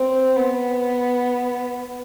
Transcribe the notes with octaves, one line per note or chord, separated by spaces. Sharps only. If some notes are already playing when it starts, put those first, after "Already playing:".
Already playing: C4
B3